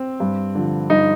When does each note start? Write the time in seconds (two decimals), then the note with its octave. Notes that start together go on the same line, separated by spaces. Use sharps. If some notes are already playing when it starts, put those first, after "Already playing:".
Already playing: C4
0.20 G2
0.55 D3 F3
0.90 G2 D#4